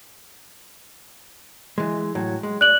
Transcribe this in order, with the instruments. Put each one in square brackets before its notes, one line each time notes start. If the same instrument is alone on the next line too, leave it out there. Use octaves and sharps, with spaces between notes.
[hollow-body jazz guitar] E3 G#3
A2 F#3
G#3
[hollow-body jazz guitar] D5 [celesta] F#6 F#7